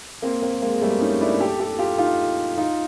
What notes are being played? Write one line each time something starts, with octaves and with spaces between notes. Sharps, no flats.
A#3 C4
A#3 C4
G#3 A#3
G3 A3
C#4 D#4
D4 E4
G4 A4
G4 A4
F4 G4
D#4 F4
D#4 F4